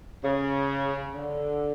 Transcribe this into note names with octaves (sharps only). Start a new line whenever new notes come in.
C#3
D3